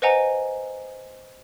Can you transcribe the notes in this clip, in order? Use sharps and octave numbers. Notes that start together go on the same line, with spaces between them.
B4 C5 D#5 F#5 G#5 A#5